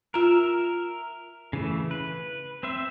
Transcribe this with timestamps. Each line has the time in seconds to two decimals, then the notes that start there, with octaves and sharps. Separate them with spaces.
0.14 F4 A#4 E5 A#5
1.53 C#3 E3 A3
1.91 B4
2.63 C4 C5 E5